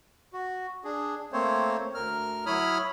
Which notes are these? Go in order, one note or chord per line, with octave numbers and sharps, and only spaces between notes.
F#4
D4 G#4
A3 A#3 C4 C5 C#5
D2 A#4 F6
F#3 E4 C#5 B5 D#6 F6